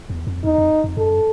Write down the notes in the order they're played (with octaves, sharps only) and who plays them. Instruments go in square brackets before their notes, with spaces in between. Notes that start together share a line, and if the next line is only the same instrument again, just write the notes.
[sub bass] E2
F2
[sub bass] E2 [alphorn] D#4
[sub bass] F2
F2
[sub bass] F#2 [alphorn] A4